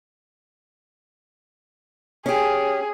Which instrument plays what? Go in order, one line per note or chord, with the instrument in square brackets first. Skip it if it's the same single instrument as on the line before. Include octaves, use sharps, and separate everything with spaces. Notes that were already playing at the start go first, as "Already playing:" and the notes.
[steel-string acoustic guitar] C#4 G4 [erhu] G#4